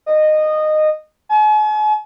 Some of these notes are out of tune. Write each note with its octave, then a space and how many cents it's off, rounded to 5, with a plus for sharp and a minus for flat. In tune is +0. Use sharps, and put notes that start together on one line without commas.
D#5 -15
G#5 +45